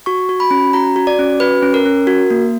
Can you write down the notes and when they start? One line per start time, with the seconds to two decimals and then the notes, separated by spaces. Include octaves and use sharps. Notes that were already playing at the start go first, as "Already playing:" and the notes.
0.06 F#4 C#6
0.29 F#4
0.40 B5
0.51 C#4
0.73 F#4 A#5
0.96 F#4
1.07 D5
1.19 C#4
1.40 F#4 B4
1.63 C#4
1.74 A#4
1.86 C#4
2.07 F#4
2.30 A#3